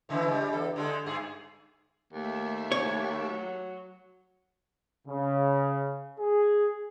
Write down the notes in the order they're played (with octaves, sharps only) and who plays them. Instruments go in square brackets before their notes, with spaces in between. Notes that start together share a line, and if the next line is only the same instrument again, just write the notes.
[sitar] A2 C#3 E3
G3 G#3
E2 A4
D3 G#3 A4
G2 G#4
[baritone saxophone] D#2 [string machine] A3 E5
[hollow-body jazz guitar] C#5
[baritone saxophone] F#3
[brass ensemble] C#3
G#4